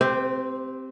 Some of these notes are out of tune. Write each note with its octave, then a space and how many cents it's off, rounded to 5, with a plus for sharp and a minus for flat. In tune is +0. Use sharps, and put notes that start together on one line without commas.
C4 +0 G4 +5 C5 -45